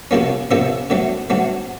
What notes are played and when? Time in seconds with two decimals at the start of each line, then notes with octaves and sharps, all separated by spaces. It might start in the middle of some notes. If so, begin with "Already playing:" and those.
0.11 C3 F3 A#3 C#4
0.51 C3 F3 A#3 C#4 E5
0.90 D3 F#3 A3 C4
1.30 D3 F#3 A3 C4